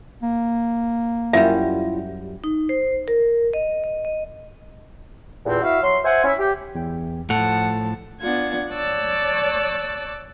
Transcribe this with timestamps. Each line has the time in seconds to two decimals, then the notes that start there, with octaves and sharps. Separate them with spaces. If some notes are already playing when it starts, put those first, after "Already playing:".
0.23 A#3
1.33 F#2 G3 E4 F4 E5
2.44 D#4
2.69 C5
3.08 A#4
3.54 D#5
3.84 D#5
4.05 D#5
5.46 E2 G2 A#2 C4
5.62 E4 F#4 E5 F5
5.83 F#3 C6
6.04 C5 E5 F#5 G#5
6.24 C#4 E4
6.38 G4
6.75 E2 G5
7.30 A2 F3 A4 F#5 A5
8.20 B3 D4 F4 F#5 G#6
8.72 C#5 D5 A5 D6 E6 F#6